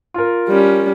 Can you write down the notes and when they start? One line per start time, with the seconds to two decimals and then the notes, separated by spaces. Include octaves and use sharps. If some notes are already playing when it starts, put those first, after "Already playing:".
0.14 F4 A#4
0.48 G3 C#4